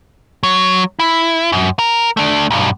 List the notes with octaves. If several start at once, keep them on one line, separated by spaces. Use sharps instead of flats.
F#3
E4
F#2
A#4
A3 D4
B1 G2